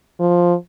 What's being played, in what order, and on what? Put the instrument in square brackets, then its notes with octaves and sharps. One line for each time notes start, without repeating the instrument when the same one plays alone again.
[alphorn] F3